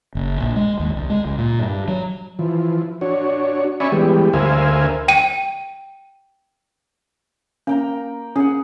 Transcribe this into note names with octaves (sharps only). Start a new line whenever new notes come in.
F#1
A#1
G#3
D#2
C2
G#3
C#2
A#2
G2
F#3
E3 F3
D4 F#4 C#5
C#4 D5 E5 G#5 B5 C#6
E3 G3 G#3 B3 G4
D2 A#4 C5 E5 F5 G#5
G5 D#7
A#3 C#4 G5 A#5
C#4 G#4 F#5